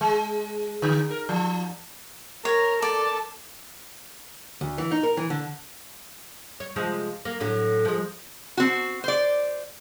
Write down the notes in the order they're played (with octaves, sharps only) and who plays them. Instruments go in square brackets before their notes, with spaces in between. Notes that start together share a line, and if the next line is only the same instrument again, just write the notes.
[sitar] G#3
D3
A#4
F3
[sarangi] A#4 [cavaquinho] C#5
[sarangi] A4 [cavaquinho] D5
[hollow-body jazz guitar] D2
E3
D#4
A#4
E3
D3
[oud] C#5
C3 F3 G#3
A#3
A2 D3 F#3
F3 G#3
[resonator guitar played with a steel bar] C4 F#4
C5 D5